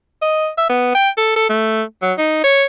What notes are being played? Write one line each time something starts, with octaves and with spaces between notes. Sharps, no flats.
D#5
E5
B3
G5
A4
A4
A3
F#3
D#4
C#5